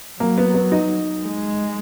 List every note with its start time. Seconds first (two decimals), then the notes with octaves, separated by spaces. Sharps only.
0.20 F#3 A#3
0.38 B3
0.54 B3
0.72 D#4
1.23 G#3